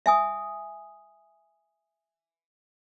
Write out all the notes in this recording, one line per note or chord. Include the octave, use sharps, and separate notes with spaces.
E5 G#5 D#6